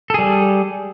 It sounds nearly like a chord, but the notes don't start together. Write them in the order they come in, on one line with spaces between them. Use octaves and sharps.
A4 G#4 G3